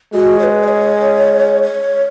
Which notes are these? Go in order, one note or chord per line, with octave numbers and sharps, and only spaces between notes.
G#3 F#4
C#5
B4
D#5
C#5
C#5